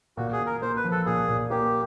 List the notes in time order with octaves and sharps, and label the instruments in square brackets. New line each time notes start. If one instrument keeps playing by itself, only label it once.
[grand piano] A#2 [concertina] F#4
[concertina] G#4
[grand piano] A#2
[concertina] A#4
[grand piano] A#3 [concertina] C5
[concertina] B4
[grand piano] F3
[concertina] A4
[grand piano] A#2 [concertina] G#4
[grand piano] A#2
[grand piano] A#3 [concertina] G4